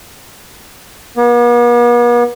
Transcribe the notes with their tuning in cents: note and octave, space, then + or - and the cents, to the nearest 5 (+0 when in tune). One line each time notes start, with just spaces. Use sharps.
B3 -45